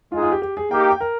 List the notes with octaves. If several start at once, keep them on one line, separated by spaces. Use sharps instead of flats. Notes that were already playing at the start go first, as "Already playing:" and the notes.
G#3 D#4 F4 G#4
F4
G4
G4
G#4
A#3 D#4 G4 G5
G5
A#4